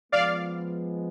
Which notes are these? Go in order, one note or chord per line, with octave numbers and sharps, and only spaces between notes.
F3 G#3 B3 D5 F5